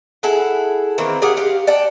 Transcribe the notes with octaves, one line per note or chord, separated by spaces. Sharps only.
E4 G#4 A4 F#5
D#3 E3 A#3 C4
G4 G#4 F5 F#5
G4 F5 F#5
D5 F#5 G5 A5